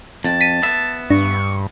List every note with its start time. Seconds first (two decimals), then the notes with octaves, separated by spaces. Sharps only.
0.25 F2 A5
0.41 B6 D#7
0.62 B3 E5
1.10 G2 D4 C#6